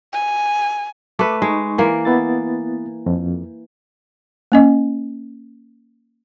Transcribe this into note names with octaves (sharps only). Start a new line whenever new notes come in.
G#5
A3 B4 D6
G#3 D#4 C#6
E3 A#3
B3 E4 A6
F2
A#3 C#4 D#5